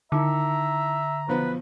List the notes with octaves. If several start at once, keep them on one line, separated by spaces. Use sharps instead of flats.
D3 D#3 E4 E5 A#5
B1 F3 B3 B4